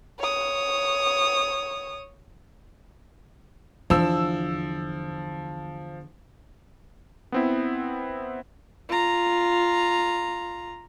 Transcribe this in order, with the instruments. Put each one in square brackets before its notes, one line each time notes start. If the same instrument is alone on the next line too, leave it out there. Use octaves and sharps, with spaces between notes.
[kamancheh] C#5 D#6
[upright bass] E2 D3 [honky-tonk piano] F3 E6
[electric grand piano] B3 C4 E4
[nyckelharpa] F4 A#5